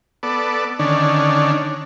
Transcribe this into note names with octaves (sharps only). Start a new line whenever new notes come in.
B3 A4 D5
D3 D#3 C#4 D4